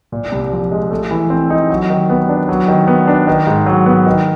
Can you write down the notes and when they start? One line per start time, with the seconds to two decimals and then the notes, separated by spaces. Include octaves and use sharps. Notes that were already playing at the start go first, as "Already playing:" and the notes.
0.12 A#2
0.32 C2
0.52 F3
0.71 G#3
0.91 A3
1.11 E3
1.30 C4
1.50 D#4
1.70 F#3
1.90 D#3
2.10 B3
2.29 D4
2.49 F#3
2.68 D#3
2.88 B3
3.07 D4
3.27 D#3
3.47 G#2
3.66 F#3
3.86 B3
4.07 D#3